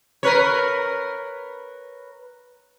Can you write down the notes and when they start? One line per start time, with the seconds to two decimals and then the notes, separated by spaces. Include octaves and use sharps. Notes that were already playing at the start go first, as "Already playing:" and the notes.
0.23 A#4 B4 C#5